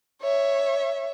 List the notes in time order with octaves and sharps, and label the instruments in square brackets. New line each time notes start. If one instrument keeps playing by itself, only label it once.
[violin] C#5 E5